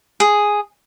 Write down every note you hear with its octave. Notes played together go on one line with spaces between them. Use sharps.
G#4